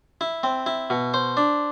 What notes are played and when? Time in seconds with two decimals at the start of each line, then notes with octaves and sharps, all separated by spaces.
0.21 E4
0.43 C4
0.66 E4
0.90 B2
1.14 C5
1.37 D4